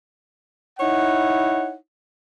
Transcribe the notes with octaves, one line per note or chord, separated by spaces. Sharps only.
D#4 E4 C#5 F#5